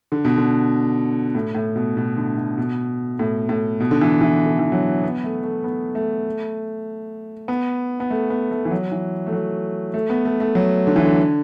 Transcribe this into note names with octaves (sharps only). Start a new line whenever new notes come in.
D3
B2
D3
A2
A2
B2
B2
D3
B2
B2
A2
A2
B2
D3
E3
E3
D3
E3
F#3
B3
A3
A3
B3
A3
B3
B3
A3
B3
A3
E3
F#3
E3
A3
F#3
A3
B3
A3
A3
F#3
D3
E3
D3